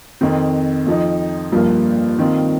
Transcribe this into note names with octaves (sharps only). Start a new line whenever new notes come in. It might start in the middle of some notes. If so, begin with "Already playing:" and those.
F2 D#3 C4
F2 F3 D#4
G2 F3 A#3 F4
D#3 C4 F4